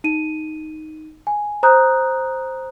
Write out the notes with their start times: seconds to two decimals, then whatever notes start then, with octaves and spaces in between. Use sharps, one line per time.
0.04 D#4 D#7
1.27 G#5
1.63 C5 A#5 D#6 F#6 G6